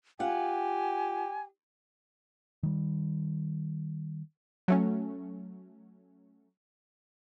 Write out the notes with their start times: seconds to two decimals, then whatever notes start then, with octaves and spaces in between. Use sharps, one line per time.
0.20 F4 G4 F#5 G#5
2.63 D#3 G3
4.68 F#3 A3 C#4